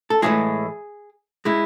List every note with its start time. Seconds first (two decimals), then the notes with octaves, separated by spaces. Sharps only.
0.10 A4
0.22 A2 E3 G#3 G#4
1.45 G#3 E4